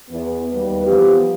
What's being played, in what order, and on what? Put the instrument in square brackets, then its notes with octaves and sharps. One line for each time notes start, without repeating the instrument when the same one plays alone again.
[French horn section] E2 B3
D#2 G3 B4
E3 F3 B3 F4 G4